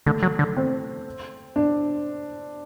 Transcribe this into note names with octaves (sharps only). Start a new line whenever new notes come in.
D3 A3
F#3
D3
C4
D4